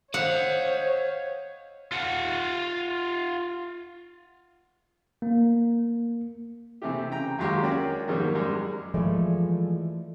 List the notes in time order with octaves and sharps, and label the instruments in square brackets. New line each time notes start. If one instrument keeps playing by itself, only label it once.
[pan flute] C5 [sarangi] C#5 [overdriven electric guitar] D#5 F5 [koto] F#5
[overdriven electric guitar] F4 F#5
[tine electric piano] A#3
[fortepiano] C3 E3 A3 G4
C#3 G5 A#5
D#2 F#3 G#3 G4 F5
C#4 F#4 A#4 D5 G5 G#5
F2 G#2 D#3 F#3 G3 A#3
F#2 G3 G#3
[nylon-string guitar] E3 F3 G#3 A3 D5